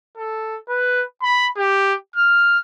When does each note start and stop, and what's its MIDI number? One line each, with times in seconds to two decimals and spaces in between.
0.17 0.57 69
0.69 1.03 71
1.23 1.47 83
1.57 1.94 67
2.16 2.58 89